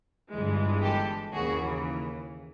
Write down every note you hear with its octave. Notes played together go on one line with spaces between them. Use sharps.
G1 G2 E3 G#3
G4 A4
D#2 C#3 E3 F#4 G#4